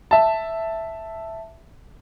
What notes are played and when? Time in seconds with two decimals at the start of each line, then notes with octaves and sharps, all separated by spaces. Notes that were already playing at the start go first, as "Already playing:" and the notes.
0.11 E5 A5